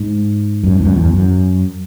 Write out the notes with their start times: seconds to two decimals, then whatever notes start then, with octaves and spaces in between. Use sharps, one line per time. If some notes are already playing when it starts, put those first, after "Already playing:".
Already playing: G#2
0.63 F#2
0.74 G#2
0.80 E2
0.85 F#2
0.96 E2
1.13 F#2